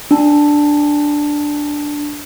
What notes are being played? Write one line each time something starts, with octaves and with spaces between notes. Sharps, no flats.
D4 A5